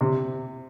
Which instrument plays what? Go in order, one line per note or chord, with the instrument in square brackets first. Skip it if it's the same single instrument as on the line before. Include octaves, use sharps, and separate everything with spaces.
[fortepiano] C3